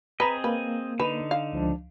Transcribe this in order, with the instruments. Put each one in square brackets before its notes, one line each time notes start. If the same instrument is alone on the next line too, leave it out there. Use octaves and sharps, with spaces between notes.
[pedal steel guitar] C4 G#4 D#5 [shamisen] B4 [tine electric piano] A#5 B6
[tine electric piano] A#3 [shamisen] B4
[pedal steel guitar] D3 D#4 [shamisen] B4
[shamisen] F5
[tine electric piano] C#2 F3 D4